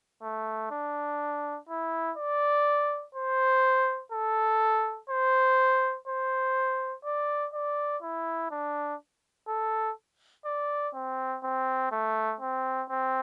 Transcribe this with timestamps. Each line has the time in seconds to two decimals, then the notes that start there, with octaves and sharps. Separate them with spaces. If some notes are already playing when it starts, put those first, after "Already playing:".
0.23 A3
0.71 D4
1.69 E4
2.18 D5
3.15 C5
4.12 A4
5.10 C5
6.08 C5
7.05 D5
7.53 D5
8.02 E4
8.51 D4
9.48 A4
10.46 D5
10.94 C4
11.43 C4
11.92 A3
12.41 C4
12.89 C4